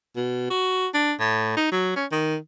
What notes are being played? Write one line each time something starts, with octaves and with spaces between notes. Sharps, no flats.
B2
F#4
D4
A2
D#4
F#3
C#4
D#3